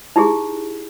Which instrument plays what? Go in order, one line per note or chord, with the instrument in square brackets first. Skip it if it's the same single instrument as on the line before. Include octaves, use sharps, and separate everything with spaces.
[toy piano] D#4 E4 G4 G#4